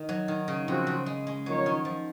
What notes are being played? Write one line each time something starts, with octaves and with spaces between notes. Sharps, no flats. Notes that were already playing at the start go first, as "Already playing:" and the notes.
Already playing: D#3
F#3
D#3
C#3
C#3 F3 C4 F#4
C#3
G#3
G#3
F3 F#3 A#3 D#4 A#4 C#5
D#3
F3